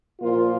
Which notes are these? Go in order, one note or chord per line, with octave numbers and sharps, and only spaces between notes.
A#2 F3 A#3 F4